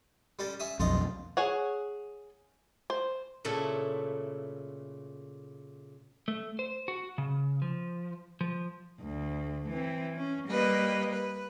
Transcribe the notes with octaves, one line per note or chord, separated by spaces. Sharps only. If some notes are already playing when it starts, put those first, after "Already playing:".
G3 C#4 A4
C#4 E5 D#6
B1 F2 F4 A4 D#5
G#4 C#5 F#5
C5
A#2 C#3 A3 E4 A4
A3
C5
F#4
C#3
F3
F3
D2
E3 C4
C#4
G3 A#3 G4 B4 D#5
B4